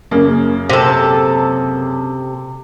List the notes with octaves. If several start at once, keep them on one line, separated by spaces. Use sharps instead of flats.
F#2 C#3 A#3
C3 A4